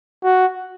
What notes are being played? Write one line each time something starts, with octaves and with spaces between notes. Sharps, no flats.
F#4